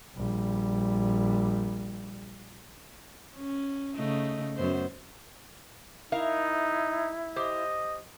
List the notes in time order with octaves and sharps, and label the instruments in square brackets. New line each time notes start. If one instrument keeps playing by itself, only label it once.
[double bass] A#1 G3
[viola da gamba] C#4
C#3 A3 D#4
F#2 B3 C5
[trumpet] D#4 [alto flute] E4 [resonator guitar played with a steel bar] A#4 E5 F5
[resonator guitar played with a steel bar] G4 C5 [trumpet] D#5